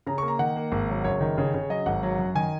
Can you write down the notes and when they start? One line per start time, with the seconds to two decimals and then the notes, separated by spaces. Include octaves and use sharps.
0.07 C#3 A#5
0.18 A#3 C#6
0.28 A#5
0.39 D#3 F#5
0.56 A#3
0.72 G#1
0.89 F#3
1.04 F#1 C#5
1.21 D#3
1.38 C#3
1.54 C#3
1.70 F#3 D#5
1.86 G#1 F#5
2.03 F#3
2.19 F#2
2.35 D#3 G#5